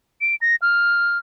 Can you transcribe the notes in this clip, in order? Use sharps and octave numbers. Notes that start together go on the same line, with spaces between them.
D7
A#6
F6